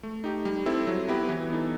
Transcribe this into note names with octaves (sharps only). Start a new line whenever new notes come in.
A3
D#4 G4
G3
C4 E4 A4
F#3
B3 E4 G4 B4
E3
B3 D#4 A4